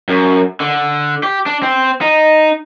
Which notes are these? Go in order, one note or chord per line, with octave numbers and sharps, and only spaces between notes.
F#2
D3
G4
D4
C4
D#4